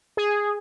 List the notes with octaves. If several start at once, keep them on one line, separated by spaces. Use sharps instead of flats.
G#4